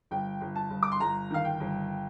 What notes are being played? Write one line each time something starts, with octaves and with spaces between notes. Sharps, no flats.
G1 G5
G1
A5
G1
D6
C6
G1 A#5
D#3 F5
G5
G1